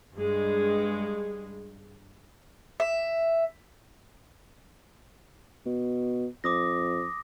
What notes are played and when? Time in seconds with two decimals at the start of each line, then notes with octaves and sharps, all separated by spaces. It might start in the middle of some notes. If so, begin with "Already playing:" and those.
0.14 G2 G#3
2.80 E5
5.66 B2
6.44 F2 D6 D#6 A#6